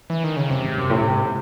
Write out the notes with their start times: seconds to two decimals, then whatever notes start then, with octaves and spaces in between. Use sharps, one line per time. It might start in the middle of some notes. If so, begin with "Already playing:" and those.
0.10 E3
0.24 D#3
0.36 C#3
0.49 F#2 C3
0.63 G#2
0.77 F#2
0.90 A2
1.00 A2
1.09 G#2